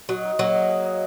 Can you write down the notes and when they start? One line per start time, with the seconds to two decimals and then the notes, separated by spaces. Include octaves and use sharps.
0.09 F#3 D#5
0.24 D#4
0.39 F#3 G#3 A#3
0.54 D#5
0.69 G#4
0.85 D#5